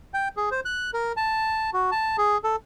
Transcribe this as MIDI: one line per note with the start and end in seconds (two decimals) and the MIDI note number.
0.14 0.28 79
0.37 0.49 68
0.51 0.60 72
0.65 0.91 90
0.94 1.12 70
1.17 1.70 81
1.74 1.90 66
1.91 2.16 81
2.18 2.38 68
2.44 2.56 69